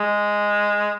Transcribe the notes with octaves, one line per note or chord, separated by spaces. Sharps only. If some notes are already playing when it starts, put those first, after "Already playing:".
Already playing: G#3